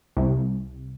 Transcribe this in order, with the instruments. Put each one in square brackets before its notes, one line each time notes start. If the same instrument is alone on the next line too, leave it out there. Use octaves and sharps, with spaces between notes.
[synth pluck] C2